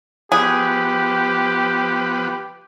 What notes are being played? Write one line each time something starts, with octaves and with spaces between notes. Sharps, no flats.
F3 B3 G4 G#4 B4